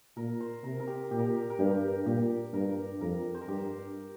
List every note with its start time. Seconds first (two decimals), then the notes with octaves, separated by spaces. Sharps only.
0.17 A#2 A#4
0.40 C5
0.64 C3 A#4
0.80 A#4
0.87 G4
1.11 A#2 G4
1.19 A#4
1.26 G4
1.50 A#4
1.59 G2 G4
2.06 A#2 G4
2.54 G2 A#4
3.01 F2 A#4
3.34 C5
3.41 A#4
3.48 G2 G4